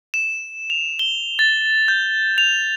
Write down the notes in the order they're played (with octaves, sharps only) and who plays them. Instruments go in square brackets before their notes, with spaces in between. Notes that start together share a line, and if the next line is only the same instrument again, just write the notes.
[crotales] E7
F7
G7
A6
G6
F7